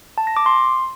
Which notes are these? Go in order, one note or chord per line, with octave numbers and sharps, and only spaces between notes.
A5
A#6
D6
C6